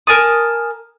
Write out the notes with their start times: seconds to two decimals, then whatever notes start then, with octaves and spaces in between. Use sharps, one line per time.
0.07 A#4 G#5 A5 D#6